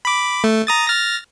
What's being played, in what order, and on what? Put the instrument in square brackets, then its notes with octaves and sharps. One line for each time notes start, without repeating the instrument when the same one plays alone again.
[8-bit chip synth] B5 D6
A3
A#5 D#6 A6
F6 A6 A#6